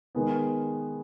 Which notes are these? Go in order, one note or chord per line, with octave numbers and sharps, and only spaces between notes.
D#3 G#3 B3